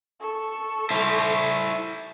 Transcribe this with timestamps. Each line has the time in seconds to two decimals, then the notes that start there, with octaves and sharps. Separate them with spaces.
0.20 A4 C#6
0.90 E4 C5